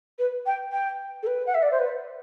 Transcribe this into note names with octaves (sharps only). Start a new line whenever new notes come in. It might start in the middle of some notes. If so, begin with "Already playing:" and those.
B4
G5
G5
A4
B4
F#5
E5
D5
C5
B4